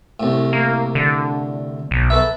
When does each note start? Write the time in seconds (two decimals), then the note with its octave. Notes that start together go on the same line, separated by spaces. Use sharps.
0.20 C2 A2
0.53 A#3
0.95 D3
1.91 B1
2.10 A4 B4 E5